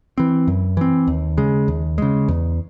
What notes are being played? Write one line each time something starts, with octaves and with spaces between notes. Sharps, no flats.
E3 C4
F#2
E3 C4
D#2
C#3 G#3
D#2
C#3 G#3
E2